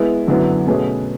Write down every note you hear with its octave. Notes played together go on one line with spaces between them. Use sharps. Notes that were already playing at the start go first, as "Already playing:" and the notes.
Already playing: G#3 B3 E4
F#2 D3 F#3 B3 E4
B2 A3 C#4 G#4 B4